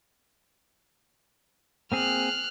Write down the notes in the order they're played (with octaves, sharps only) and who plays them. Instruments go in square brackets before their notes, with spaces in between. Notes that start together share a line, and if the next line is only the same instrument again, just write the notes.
[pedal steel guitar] A#3 C4 G#4 [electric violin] F6 F#6